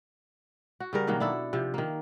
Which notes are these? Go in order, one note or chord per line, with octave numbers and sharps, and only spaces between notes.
F#4
C#3 G3 A#4
B2 D#3 F#3 A#3
D4 E4 A4
C3 F3
D#3 A#3